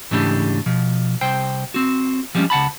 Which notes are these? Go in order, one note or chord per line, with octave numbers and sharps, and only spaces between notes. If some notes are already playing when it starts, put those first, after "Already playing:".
G#2 C#3 E3 A3 D4 G4
B2 F3
C2 C5 G5
C4 F#4
F3 G3 G#3 A#3 C#4
C#2 F#5 A5 B5